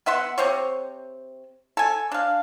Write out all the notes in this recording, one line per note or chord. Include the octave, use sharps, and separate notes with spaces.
B3 E5 F#5 C6
C3 C4 C5 C#5
A4 G#5
D4 F5